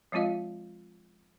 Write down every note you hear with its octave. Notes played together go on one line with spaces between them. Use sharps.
F3 G#3 C4 F4 D#5 F5